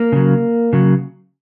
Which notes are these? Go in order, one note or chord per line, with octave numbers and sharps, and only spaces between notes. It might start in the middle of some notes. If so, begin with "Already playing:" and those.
Already playing: A#3
C#3 F#3
C#3 F#3